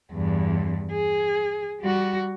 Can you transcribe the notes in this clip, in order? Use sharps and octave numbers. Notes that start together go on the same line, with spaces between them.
E2 G2
G#4
G3 F#4